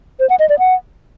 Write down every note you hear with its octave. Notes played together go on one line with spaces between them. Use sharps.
C5
F#5
D#5
D5
F#5